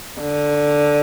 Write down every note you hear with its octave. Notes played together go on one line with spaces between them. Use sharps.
D3